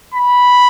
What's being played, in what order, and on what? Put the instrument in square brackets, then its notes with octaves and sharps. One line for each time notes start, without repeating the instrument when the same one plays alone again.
[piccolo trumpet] B5